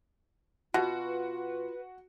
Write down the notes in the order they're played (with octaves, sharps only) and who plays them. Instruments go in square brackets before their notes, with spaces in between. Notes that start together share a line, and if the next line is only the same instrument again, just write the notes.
[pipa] B2 [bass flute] F4 [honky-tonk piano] F#4 [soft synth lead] B4